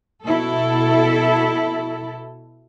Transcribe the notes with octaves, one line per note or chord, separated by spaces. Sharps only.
B2 E4 A4